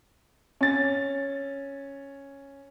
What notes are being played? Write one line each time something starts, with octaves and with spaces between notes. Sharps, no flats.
C#4 A6